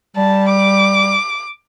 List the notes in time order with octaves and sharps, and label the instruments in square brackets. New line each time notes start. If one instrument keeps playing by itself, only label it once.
[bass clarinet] G3 [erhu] A5
[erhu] D6